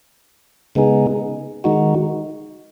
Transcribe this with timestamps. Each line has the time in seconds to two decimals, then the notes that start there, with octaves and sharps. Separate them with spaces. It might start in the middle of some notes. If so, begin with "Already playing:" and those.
0.75 C#3 G#3 B3 D#4 G#4
1.64 D#3 G#3 D#4 F#4